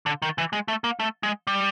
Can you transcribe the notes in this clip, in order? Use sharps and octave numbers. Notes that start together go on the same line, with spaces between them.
D3
D#3
E3
G#3
A3
A#3
A3
G#3
G3